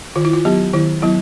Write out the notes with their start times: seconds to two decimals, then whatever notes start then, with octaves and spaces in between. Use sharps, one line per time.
0.16 D#3 F4
0.25 E4
0.33 F4
0.45 F#3 B3 G4
0.73 D#3 E4
1.02 F#3 B3 E4